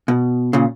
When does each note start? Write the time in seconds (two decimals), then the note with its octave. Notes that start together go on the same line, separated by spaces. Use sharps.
0.08 B2
0.53 A#2 C#3